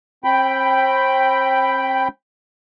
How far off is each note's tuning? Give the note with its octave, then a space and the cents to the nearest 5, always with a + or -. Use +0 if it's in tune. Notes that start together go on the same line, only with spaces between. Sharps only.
C4 +35 G5 +0 B5 +5